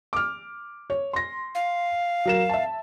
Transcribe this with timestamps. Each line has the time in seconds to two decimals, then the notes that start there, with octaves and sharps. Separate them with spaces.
0.13 D6 F6
0.90 C#5
1.13 C6 A#6
1.55 F5
2.25 F#3 A#4 E7
2.49 E5 A5